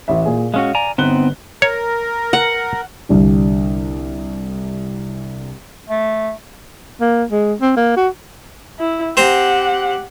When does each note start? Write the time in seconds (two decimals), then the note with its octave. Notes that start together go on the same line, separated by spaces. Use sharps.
0.08 A1 E5
0.25 A#2 G#4
0.54 G#3 C#4 F#4 F5
0.75 D5 G#5 A#5
0.98 G1 B3 C4 D#4 F#6 G7
1.62 A#4 C#5
2.33 F#5
3.09 C2 D3 G3
5.90 A3
7.01 A#3
7.31 G#3
7.61 C4
7.76 A#3
7.97 F#4
8.79 E4
9.17 C4 G4 C5 F#5 A#5